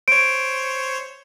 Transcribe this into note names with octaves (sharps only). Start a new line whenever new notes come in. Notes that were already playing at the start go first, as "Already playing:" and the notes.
C5 C#5 D7